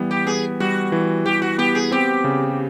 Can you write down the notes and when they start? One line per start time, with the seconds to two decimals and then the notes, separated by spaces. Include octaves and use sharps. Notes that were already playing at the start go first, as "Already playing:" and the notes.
Already playing: E3 G3 B3
0.11 G4
0.27 B3 G#4
0.60 G3 F#4
0.92 E3
1.26 E3 G4
1.42 F#4
1.58 B3 G4
1.75 G#4
1.91 C4 G4
2.24 C#3